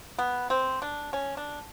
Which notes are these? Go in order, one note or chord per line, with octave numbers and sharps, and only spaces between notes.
B3
C4
D4
C#4
D4